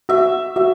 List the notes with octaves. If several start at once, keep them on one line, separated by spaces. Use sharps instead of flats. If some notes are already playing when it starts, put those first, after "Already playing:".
F#4 E5
F#4 E5